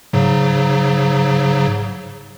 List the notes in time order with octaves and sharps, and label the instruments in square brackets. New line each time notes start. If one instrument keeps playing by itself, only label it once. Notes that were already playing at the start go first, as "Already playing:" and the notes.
[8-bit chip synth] G#2 C#3 F#3